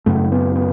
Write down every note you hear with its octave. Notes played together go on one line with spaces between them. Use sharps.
F#2 C#3 A3
B3
B3